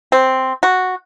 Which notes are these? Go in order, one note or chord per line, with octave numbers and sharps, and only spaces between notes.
C4
F#4